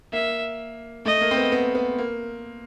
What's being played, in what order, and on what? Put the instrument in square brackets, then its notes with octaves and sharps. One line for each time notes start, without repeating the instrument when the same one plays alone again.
[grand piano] A#3 [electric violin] E5
[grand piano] A3 [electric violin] D#5
[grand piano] A#3
C4
B3
B3
B3
A#3